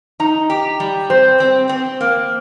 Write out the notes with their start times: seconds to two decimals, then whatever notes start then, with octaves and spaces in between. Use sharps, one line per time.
0.20 D#4 A#5
0.50 G4
0.80 G3
1.10 C4 C5
1.40 C4
1.69 C4
2.01 A#3